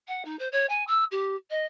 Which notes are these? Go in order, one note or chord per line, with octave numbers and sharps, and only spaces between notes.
F#5
D#4
C5
C#5
G#5
E6
G4
D#5